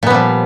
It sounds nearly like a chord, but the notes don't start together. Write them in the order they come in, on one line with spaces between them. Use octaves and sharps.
A#2 B3 G3 F3